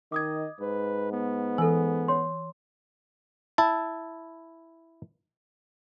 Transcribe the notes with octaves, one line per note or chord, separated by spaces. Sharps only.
D#3 D#5 D6 D#6 G#6
G#2 B4
B3
E3 A4 G#5
C#5 C6
E4 A5